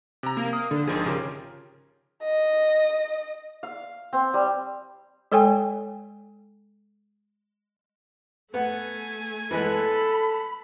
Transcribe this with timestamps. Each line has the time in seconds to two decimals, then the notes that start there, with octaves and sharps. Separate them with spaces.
0.23 C3 A#5
0.37 A#3
0.53 D#6
0.71 D3
0.87 G#1 D#3 F3 G#4
1.06 C#3 F4 G4 A#4
2.24 D#5
3.63 F5
4.13 C4
4.34 G3
5.32 G#3 A4 C#5 G5 G#5
8.54 A3 B3 F#5 G#5
9.51 E3 G#3 B3 A4 B5